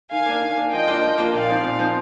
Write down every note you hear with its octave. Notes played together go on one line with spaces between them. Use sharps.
D#3 F5 G#5
A#3 D4
D#3
A#3 D4
F3 D#5 G5
A#3 D4 F4
F3
A#3 D4 F4
A#2 D5 F5
F3 C4 D#4
A#2
F3 C4 D#4